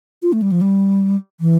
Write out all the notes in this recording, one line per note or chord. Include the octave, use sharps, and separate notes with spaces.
F4
A3
G3
F3
G3
E3